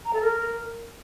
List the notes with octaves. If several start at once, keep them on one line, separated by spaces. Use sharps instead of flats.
A#5
A4
A#4